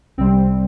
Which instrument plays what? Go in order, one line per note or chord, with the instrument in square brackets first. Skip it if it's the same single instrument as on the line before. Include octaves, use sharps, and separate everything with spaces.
[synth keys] C2 C3 G3 C4